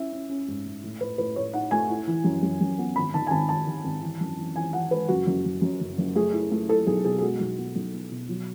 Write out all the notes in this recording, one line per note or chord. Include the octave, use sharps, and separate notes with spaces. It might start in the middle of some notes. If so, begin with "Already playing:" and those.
Already playing: C#4 E4 E5
C#4
C#4
G#2
G#2
A2
A2 B4
A2 B4
A2 C#5
D#4 F#5
A3 G#5
E4
E3
F#2
F#2
F#2
B3
G#1 B5
D#3 A5
G#5
G#1 A5
G#1 A5
D#3
G#1
E3
F#2
E3
E3 G#5
E3 F#5
G#3 B4
F#1 F#4
F#1
F#1
F#2
F#1
F#1
A3 G#4
E4
A3
E4 A4
B1 G#4
B2 G#4
G#4
G#3 F#4
B1
B3
B1
B3
B2
F#3